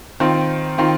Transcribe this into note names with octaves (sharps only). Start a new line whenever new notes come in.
D#3 C4 F4
D#3 C4 F4